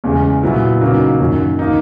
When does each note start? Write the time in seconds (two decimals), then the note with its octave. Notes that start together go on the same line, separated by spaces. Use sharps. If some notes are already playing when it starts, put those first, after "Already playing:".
0.04 E2 C#3 G#3
0.43 A#2 F#3 B3 E4
0.81 C#3 F#3 A#3 D#4
1.20 F#2 D#3 F#3
1.59 D#3 A#3 D#4